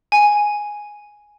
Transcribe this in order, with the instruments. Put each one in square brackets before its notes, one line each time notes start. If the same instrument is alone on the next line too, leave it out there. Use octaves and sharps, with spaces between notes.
[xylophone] G#5